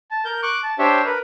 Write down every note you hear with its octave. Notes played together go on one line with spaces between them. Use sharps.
A5
A#4 G6
C#6 D6 F#6
A5
D4 G4 C5 C#5 E5
A#4 B4